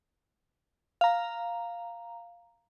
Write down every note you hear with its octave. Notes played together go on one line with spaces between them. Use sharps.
F5 A#5